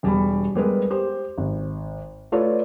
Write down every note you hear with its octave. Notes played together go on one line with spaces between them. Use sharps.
E1 G3 G#4 B5
G3 G#3 B3 G#4 A#4 B4
G4 C5
G#1
A3 F4 A4 B4 C#5 D5